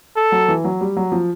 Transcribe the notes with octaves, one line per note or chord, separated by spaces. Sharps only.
A4
F#3
E3
F#3
G3
F#3
F3